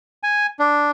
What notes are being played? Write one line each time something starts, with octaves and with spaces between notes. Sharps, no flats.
G#5
D4